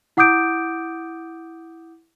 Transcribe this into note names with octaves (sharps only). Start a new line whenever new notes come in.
E4 F#5 D6 D#6 G6 D7